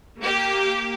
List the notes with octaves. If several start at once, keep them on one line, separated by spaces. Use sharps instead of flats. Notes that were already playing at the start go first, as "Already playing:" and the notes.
A#3 G4